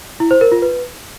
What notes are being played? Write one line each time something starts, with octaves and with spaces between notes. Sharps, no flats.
E4
C5
A#4
F4
B4